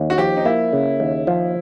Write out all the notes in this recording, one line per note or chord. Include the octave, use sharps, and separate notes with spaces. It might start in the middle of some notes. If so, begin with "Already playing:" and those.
Already playing: D#2
F#4
F3 G4
D#4
A#3 E4
C#3
D#2
F3